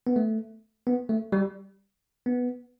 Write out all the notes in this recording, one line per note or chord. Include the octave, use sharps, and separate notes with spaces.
B3
A3
B3
A3
G3
B3